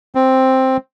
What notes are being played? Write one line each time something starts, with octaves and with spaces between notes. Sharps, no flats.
C4